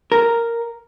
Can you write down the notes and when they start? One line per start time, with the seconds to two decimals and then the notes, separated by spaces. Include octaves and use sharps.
0.12 A#4